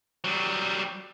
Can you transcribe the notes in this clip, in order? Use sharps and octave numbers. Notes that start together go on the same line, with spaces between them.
F#3 G3